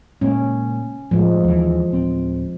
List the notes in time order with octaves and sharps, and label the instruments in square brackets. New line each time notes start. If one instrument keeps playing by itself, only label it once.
[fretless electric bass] A#2 G#3 A#3 [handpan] C#4
[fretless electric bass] A2 [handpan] F3 G#3
[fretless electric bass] D#2 E3
D1 C4